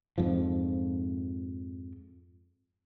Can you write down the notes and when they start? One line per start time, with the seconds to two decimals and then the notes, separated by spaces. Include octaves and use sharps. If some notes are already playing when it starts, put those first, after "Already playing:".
0.18 F2 G#2 F3